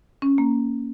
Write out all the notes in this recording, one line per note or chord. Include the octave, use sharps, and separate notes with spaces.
C#4
A#3